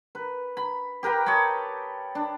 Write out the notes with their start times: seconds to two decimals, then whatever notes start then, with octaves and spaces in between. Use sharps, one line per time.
0.15 B4
0.57 B5
1.03 G4 A#4 B4 G5
1.26 C#5 D#5 A5 B5
2.15 D4